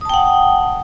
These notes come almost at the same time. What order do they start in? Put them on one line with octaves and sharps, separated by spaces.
D#6 A5 G5 F#5